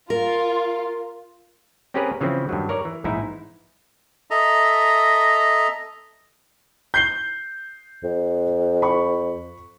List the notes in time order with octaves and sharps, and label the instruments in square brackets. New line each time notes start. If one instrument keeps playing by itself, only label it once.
[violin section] F4 [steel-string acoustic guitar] A#4
[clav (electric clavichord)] C4 C#4 G4 G#4 A#4 B4
C#3 E3 F3 C4
G2 D#3 F#3
A#4 C#5 D5
E3
A#1 G#2 E3 D#4 E4
[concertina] A4 D#5 E5 A#5
[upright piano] G6 C7 G7
[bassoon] F2
[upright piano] B5 C#6